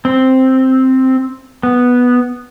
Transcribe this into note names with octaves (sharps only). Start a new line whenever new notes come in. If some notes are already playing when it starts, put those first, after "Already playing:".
C4
B3